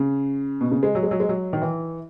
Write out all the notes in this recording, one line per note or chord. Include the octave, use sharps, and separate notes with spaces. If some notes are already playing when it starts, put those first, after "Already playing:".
Already playing: C#3
B2
C#3
G#3
F#3
G#3
F#3
G#3
F#3
D#3
E3